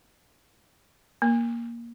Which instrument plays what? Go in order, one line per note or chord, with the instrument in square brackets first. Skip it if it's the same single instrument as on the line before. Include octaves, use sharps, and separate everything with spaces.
[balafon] A#3